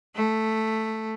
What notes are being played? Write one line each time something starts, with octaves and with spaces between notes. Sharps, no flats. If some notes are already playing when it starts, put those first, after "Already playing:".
A3